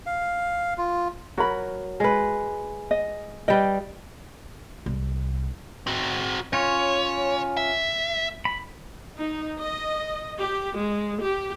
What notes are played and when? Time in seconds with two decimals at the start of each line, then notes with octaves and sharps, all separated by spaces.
0.06 F5
0.78 F4
1.38 F#3 F#4 A#4 B5
2.00 G#3 B4
2.91 D#5
3.48 G3 B4 D#5 G5
4.86 C2
5.87 C4 F#4
6.53 C#4 F4 C#5
7.57 E5
8.45 B5
9.18 D#4
9.61 D#5
10.38 G4
10.76 G#3
11.21 G4